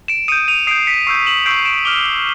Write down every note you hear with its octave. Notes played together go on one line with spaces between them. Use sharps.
D7 E7
D#6 G6 C#7 D#7
D#7 F7
D#6 G6 C7 D7
B6 C#7
C#6 E6 G6 C7
E7 F#7
C#6 E6 G6 C7 D7
D7 E7
D6 F6 F7 G7